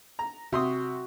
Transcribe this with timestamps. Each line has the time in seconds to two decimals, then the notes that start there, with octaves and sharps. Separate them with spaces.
0.19 A#5
0.53 C3 F#4 C6 D#6